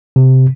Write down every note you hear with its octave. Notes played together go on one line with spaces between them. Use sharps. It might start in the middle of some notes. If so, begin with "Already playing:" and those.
C3